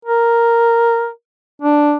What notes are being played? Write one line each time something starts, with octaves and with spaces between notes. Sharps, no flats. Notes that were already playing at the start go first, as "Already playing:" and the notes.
A#4
D4